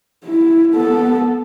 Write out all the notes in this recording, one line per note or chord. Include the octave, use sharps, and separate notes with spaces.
E4
B3 A4